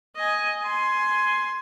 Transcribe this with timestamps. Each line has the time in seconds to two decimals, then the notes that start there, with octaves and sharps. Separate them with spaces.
0.16 D#5 G#5
0.62 G#5 C6